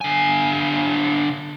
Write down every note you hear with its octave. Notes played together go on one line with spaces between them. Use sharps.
D3 G#5